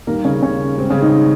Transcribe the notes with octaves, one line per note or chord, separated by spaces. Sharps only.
D#2 D#3 G3 A#3 A#4
C#3 C#4
C#3 C#4
G#2 D#3 G3 C4
C#3 C#4
D#3 D#4